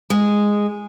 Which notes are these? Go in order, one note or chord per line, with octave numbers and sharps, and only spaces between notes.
G#3